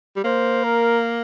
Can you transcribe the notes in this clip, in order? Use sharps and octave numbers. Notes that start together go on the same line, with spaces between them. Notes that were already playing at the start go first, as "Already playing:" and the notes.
G3
A#3 C5
A#4